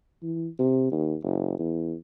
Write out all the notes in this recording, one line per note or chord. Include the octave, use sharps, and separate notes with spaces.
E3
C3
D#2
F#1
E2